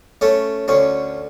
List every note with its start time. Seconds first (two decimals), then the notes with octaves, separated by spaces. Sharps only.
0.21 A3 C#4
0.68 D2 C#4